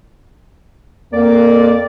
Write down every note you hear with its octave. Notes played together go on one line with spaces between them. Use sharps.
F2 A#3 D5